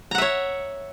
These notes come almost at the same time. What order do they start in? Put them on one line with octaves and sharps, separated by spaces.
A#5 F#5 E5 C#5